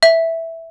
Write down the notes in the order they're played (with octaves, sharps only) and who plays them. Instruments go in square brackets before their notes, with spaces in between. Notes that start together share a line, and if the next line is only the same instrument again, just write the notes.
[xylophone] E5